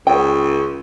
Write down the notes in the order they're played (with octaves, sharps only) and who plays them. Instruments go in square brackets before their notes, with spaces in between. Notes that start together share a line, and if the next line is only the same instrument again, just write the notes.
[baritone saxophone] C#2 [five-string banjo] G5